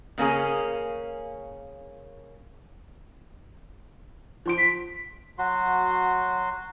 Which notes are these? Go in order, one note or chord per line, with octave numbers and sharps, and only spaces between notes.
C#3 A#3 C#4 G#4
F3 C6 D7
B6
F#3 F#4 C6